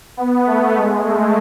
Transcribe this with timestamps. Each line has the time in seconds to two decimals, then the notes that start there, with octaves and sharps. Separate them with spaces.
0.17 B3
0.47 A3
0.76 G#3
1.04 A3